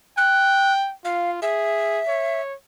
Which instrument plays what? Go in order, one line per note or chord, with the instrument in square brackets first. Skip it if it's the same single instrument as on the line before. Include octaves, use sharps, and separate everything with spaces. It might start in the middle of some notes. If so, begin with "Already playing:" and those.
[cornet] G5 [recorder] F#6
[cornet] F4 [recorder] F5
[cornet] G#4 [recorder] E5
[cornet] C#5